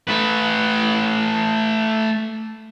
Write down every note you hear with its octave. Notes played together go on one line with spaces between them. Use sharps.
A3 B4